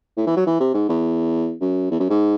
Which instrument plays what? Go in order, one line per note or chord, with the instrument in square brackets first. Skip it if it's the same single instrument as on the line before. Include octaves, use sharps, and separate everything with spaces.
[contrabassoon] A2
E3
F#3
E3
C3
G#2
E2
F#2
E2
F#2
G#2